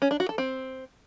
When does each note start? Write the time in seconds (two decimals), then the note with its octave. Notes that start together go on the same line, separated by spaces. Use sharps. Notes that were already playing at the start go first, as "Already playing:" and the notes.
0.02 C#4
0.11 D4
0.20 F#4
0.29 A4
0.38 C4